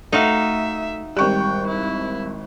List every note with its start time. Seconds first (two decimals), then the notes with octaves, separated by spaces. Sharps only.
0.13 A3 D#4 F#4 E5 F5
1.17 G#1 G3 G5 C#6 F#6
1.67 E4